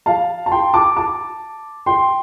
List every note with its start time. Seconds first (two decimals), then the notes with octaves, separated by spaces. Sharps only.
0.06 F5 A5
0.46 A5
0.51 G5 C6
0.74 A5 D6
0.96 A5 D6
1.86 G5 C6